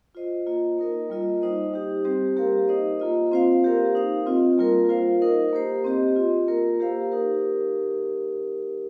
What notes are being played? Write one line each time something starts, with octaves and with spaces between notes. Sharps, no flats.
F4 C5 D#5
A#3 F4 D#5
A#3 D#4 A#4 D#5
G3 A#3 F4 D#5
G3 D#4 C5 D#5
G3 D#4 G4
G3 C4 G4 C5
A#3 G4 A#4 F5
D#4 C5 D#5
A#3 F4 D#5
C4 F4 C5 F5
A#3 G4 A#4 F5
D#4 C5 F5
C4 F4 D#5
G3 A#3 F4 A#4
F4 C5 F5
D#4 A#4 D#5
A#3 G4 C5
C4 G4 D#5
F4 D#5
A#3 F4 A#4
A#3 G4 C5 F5
D#4 G4 A#4